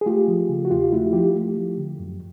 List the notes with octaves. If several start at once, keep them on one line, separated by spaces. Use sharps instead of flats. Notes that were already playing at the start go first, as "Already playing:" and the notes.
G#4
A3 F4 G4
F3
C#3
F#4
E2 F4 G4
A3 E4 F#4
F3 F4 G4
A3
F3
D3
F#2